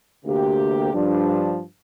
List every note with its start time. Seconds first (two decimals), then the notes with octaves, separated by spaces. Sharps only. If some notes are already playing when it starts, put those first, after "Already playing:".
0.24 D2 C3 A#3 G4
0.92 G2 F3 D4